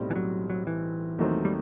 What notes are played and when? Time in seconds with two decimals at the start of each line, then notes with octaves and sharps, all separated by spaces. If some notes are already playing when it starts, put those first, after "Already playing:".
Already playing: B1 A2 G3 C4
0.11 E3
0.16 F#3
0.50 F#3
0.67 E3
1.18 D#2 D#3 F#3 A3 C4
1.45 G3